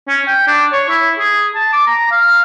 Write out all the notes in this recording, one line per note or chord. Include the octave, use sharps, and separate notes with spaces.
C#4
G5
D4
C#5
E4
G#4
A5
D6
A#5
F5